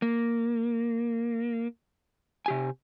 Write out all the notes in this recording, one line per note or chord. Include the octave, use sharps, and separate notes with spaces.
A#3
C3 G4 G#5